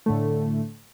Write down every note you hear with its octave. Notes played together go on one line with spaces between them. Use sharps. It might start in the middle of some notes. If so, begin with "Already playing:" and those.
A2 D3 A3